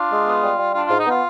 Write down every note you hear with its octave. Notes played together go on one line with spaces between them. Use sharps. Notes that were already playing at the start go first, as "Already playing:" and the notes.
Already playing: D4 F4
G#3
B3
G3
G3
D4 F4
G#2 F4
D#4
B3 F4